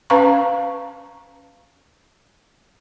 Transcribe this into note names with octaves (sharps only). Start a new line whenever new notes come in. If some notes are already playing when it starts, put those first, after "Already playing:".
C#4 B4 F5 A#5 C#6